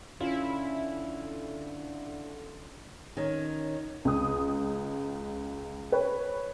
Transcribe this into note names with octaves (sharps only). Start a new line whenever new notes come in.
D3 C#4 E4 F4
D#3 C#4
C#2 D#6
B4 C#5